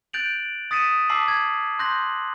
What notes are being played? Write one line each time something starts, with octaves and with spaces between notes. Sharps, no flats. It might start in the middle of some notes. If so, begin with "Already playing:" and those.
F#6 G6 A6 D7 F7 F#7
D#6 A6 B6 C#7 D#7 E7
A5 D6 E6 B6 C7 F#7
G#6
C6 F#6 G6 A#6 F#7